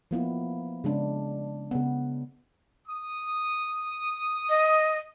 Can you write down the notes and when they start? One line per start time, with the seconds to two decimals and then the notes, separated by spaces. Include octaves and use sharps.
0.11 F3 A#3 B3 E4
0.84 C#3 G#3 D4
1.71 C#3 B3
2.88 D#6
4.49 D#5